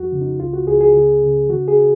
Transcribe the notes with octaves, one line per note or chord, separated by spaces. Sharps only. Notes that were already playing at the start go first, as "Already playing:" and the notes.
Already playing: F2 F#4
C#3
D#4
C#2 F4
F#4
C#2 G#4
G#4
C#3
C#3
D#3 F#4
G#4